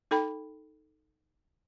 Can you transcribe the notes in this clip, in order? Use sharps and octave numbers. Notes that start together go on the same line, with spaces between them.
D#4 A4 G5 B5